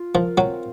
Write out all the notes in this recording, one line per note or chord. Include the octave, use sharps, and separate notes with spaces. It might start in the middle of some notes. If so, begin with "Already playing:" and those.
Already playing: F4
F3 A#4
F#3 C4